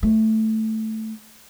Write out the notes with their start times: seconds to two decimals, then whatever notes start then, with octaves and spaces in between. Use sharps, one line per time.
0.03 A3